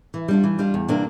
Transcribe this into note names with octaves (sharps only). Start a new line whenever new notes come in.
E3
G3 D4 F4
E3
G3 D4 F4
E2
C3 E3 A#3 D4